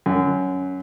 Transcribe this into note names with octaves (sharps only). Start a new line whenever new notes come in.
F#2